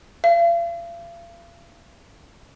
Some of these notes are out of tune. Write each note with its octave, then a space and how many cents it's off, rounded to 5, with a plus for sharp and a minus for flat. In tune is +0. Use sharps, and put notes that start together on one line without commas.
F5 -40